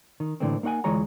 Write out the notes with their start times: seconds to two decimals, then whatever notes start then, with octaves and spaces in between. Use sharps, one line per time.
0.20 D#3
0.40 A2 D3 E3 A3 A#3 C4
0.63 A#3 D#4 C#5 F#5 G#5
0.84 D2 E3 G#3 F4 C#5 A#5